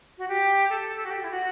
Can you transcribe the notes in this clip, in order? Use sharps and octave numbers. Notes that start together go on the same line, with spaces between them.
F#4
G4
A4
F#4
G4
E4
F#4